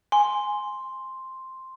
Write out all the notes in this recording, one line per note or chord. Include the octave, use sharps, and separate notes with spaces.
G#5 C6